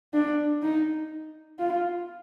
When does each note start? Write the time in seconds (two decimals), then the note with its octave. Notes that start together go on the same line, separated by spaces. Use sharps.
0.14 D4
0.63 D#4
1.59 F4